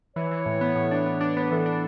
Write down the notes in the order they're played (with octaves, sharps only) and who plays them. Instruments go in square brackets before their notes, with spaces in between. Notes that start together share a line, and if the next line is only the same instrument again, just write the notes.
[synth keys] E3 [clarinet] C#5
[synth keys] E3
A2
B3
A2
D4
B3
D4
[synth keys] B3 [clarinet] C#5
[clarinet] B4
[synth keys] E3 [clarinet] A4
[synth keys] D4